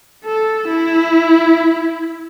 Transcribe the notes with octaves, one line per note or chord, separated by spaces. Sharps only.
A4
E4